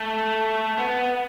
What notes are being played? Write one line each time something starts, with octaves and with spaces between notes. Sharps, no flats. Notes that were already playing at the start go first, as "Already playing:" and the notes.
Already playing: A3
B3